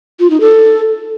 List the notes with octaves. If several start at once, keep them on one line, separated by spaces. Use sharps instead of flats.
F4
D#4
A4